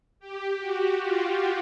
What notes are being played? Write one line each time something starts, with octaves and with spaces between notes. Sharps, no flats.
G4
F#4
F4